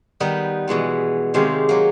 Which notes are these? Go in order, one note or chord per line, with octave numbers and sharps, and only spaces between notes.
D#3 G3 B3 D#4 B4
B2 E3 G#3 B3
C3 D#3 G#3 G4 C#5 F5
F#3 A#3